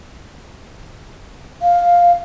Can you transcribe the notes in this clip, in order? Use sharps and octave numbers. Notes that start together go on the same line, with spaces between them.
F5